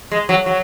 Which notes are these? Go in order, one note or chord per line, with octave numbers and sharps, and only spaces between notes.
G#3
F#3
F#3